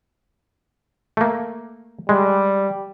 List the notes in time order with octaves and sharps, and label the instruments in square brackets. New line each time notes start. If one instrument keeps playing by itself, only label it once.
[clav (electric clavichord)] A3 A#3
[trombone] G3 [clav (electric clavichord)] G#3